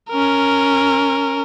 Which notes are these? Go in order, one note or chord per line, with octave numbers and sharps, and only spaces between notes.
C#4 A#4